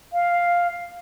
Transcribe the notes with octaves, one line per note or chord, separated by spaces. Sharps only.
F5